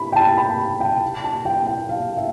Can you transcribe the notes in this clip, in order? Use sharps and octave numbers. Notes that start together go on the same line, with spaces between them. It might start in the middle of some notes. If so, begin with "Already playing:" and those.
Already playing: B5
G5
A5
B5
G5
A5
G5
G5
F5
E5